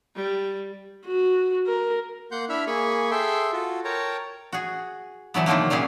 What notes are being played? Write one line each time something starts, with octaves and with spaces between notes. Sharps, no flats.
G3
F#4
A#4
A#3 F#5 C6 G6
D4 E4 E5 B5 F6
A#3 G#4 G#5 B5 C#6
G#4 A4 E5 G5 C6
F4 F#4 A4
A#4 C#5 G5 A5 A#5
F#4 G#4
A2 D3 E3 F#3 B3
C3 D#3 F3 F#3 A#3
A#2 F#3 G3 C#4 G#4